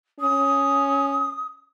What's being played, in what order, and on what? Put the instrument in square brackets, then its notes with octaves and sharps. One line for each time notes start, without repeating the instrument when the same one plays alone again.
[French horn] C#4 [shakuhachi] D#6